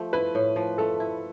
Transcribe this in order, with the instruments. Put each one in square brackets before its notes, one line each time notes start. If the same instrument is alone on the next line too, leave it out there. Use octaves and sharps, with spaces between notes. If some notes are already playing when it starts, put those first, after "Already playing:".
Already playing: [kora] F3 A3
[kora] E4 [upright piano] B4
[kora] A2
F3
[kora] A3 [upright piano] A4
[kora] E4